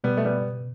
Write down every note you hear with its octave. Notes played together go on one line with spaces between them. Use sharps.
B2 G3 B3
A3
G3 B3